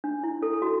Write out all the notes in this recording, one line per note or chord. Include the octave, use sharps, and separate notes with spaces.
D4
E4
A4
A4
F#4